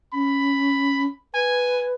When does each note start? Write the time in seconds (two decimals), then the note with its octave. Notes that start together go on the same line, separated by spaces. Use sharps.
0.13 C#4 B5
1.34 B4 G#5